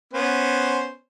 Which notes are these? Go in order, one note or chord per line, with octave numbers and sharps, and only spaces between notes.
B3 C#4 C5